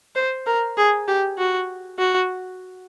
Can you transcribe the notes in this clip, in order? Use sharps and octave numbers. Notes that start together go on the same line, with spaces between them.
C5
A#4
G#4
G4
F#4
F#4